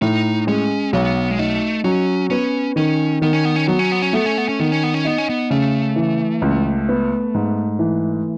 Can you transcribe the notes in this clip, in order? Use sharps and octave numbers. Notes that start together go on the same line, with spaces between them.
A2 D#4
G#3 C#4
B1 B3
G#3
A3 D#4
F#3 C#4
B3 C#4
D#3 C#4
D#3 B3
C#4
B3
C#4
F#3 B3
C#4
B3
C#4
A3 B3
C#4
B3
C#4
D#3 B3
C#4
B3
C#4
B3 D#4
C#4
B3
C#3 A3
E3
C#2
B3
G#2
E3